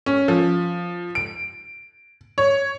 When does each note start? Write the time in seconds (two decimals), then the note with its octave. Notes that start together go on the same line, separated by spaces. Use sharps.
0.06 C#4
0.28 F3
1.15 D7
2.38 C#5